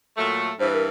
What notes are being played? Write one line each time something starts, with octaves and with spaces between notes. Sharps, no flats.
A#2 F#3 A3
G2 E3 C5
B4
A#4